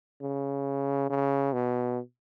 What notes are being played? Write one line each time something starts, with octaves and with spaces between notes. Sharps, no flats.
C#3
C#3
B2